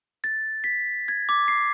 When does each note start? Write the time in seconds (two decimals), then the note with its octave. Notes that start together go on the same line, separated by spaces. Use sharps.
0.24 A6
0.64 B6
1.08 G#6
1.29 D6
1.48 C7